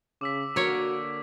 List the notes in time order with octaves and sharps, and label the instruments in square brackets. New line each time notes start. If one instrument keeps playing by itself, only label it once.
[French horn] C#3 [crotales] D6 E6 B6
[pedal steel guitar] D3 A#3 [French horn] F#4 [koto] A#4 C#5